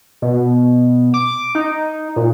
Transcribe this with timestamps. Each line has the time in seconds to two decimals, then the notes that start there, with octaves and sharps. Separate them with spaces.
0.22 B2
1.14 D6
1.55 D#4
2.16 A#2